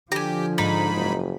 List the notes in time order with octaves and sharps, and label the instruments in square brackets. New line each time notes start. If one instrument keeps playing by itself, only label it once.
[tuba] D3 [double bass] F3 [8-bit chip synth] G4 [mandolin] G#5 A#5
[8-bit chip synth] G#2 B5 [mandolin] D#4
[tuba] F#1